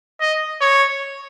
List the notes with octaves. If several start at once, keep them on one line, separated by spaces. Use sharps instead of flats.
D#5
C#5